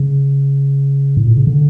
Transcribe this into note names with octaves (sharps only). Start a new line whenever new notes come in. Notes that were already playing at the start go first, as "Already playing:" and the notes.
Already playing: C#3
A2
A#2
C#3
D3